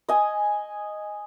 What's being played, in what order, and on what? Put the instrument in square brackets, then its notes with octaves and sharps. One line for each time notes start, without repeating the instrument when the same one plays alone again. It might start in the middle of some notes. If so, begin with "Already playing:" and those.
[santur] D#5 G#5